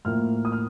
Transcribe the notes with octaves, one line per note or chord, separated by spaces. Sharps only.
A2 F3 A#3 F6
D#6
F6